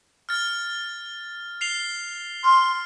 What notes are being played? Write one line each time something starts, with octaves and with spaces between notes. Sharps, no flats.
F6 A6
C7 F7 G7
C6 F6